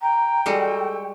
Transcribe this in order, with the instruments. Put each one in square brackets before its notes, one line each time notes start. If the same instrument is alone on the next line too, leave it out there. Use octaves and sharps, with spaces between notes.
[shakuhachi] G5 [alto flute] A#5
[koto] G3 G#3 F#4 [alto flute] A4